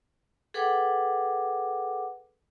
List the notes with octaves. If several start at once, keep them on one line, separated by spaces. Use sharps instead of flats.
G#4 A4 B4 F#5 G5 D6